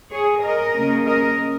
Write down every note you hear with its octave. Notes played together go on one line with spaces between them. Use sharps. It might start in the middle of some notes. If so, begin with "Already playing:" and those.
G#4 C#5
A#4 D#5
C#3 A#3 C#4
A#4 D#5